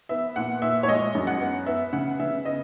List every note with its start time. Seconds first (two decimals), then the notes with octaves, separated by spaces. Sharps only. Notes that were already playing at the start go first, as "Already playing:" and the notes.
0.09 B3 E5
0.36 A#2 F#5
0.62 A#2 E5
0.83 C#5
0.88 G#3 D#5
1.15 F#2
1.27 F#5
1.40 B3
1.66 B3 E5
1.93 C#3 F#5
2.20 C#3 E5
2.45 B3 D#5